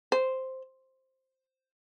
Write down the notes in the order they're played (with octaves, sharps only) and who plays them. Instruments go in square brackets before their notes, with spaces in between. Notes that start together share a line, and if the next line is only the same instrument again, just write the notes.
[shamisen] C5